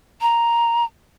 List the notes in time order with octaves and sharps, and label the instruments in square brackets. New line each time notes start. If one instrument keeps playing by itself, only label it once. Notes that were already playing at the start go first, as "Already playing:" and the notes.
[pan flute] A#5